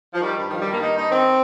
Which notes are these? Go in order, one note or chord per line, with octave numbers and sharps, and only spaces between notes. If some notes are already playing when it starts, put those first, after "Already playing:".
F3
D#3 G3
G2
D#3 F3
G3
G2
A#3
D#3 D#4
G2 D#4
D#3 C4